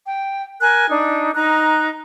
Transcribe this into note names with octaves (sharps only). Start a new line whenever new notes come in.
G5
A#4 G#5 F#6
D4 D#4
D#4 A#5 F#6